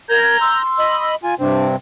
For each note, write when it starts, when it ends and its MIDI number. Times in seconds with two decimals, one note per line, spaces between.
0.09 0.38 70
0.09 0.62 82
0.09 0.62 91
0.09 0.38 92
0.40 1.09 84
0.40 1.09 88
0.79 1.15 75
0.79 1.15 83
1.23 1.35 65
1.23 1.35 80
1.39 1.76 43
1.39 1.76 48
1.39 1.76 60
1.39 1.65 62